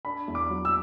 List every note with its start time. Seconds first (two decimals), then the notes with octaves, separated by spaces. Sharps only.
0.05 D4 B5
0.28 E2
0.35 D6
0.50 F#3
0.65 E6